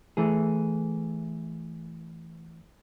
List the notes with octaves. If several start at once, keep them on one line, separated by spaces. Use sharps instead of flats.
E3 A3 G#4